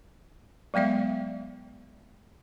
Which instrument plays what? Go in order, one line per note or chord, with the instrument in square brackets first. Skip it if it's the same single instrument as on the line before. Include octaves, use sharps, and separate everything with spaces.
[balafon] F#3 G#3 B3 D5 E5